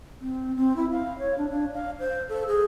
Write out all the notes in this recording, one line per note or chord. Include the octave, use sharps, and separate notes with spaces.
C4
C4
E4
F5
C#5
D4
D4
F5
C5
A4
G#4